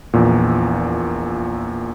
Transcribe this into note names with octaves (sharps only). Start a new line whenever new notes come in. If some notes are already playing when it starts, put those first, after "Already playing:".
A#1 E2 A#2